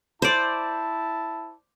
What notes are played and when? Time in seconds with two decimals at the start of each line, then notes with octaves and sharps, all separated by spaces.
0.22 E4 C5 D5 A5